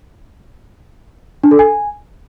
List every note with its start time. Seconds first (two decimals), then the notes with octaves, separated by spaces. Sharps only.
1.44 D4
1.51 A4
1.59 G#5